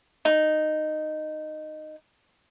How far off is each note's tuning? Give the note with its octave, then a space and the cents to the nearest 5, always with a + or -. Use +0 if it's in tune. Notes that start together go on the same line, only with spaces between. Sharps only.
D#4 -10